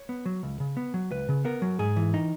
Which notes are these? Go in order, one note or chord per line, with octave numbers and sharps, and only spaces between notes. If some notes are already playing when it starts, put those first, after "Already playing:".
Already playing: C#5
B3
F#3
C#2
C#3
B3
F#3
C#2 B4
C#3
B3 A#4
F#3
G#2 G#4
E3
D#4